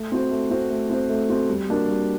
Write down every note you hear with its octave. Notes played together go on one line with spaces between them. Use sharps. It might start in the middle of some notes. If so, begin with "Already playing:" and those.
Already playing: A3
C4 F#4 C5
A3
C4 F#4 C5
A3
C4 F#4 C5
A3
C4 F#4 C5
G3
A#3 D4 F#4 A#4
G3